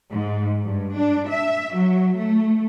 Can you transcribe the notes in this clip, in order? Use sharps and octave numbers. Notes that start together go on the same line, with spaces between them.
G#2
G2
D4
E5
F#3
A3